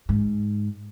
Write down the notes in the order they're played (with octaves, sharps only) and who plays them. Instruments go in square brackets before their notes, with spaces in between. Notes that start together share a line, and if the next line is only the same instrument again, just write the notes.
[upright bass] G#2